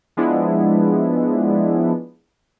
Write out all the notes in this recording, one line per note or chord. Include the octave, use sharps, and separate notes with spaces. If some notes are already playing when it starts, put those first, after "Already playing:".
F3 G#3 B3 D4 E4